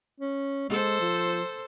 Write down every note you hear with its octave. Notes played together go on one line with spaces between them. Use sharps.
C#4
G#3 A4 C5
F3